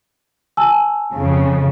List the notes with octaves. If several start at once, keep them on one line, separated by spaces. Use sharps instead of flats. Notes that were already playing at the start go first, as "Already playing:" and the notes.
G#5 A5 E6
F2 C#3